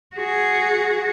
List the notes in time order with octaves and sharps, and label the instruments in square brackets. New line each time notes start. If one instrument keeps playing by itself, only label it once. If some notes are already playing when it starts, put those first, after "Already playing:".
[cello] F#4 G#4